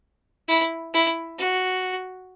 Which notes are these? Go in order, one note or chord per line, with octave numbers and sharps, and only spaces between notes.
E4
E4
F#4